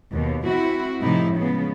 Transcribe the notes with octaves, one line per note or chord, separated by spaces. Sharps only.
D#2 B2
C4 E4 F#4
A2 C3 F3 D#4 E4
C#3 F3 G#3 B3